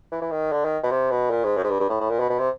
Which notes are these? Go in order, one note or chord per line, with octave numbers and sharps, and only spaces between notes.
E3
E3
D#3
D3
D#3
B2
C3
B2
A#2
G#2
F#2
G#2
G2
G2
A2
A2
A#2
B2
B2
C3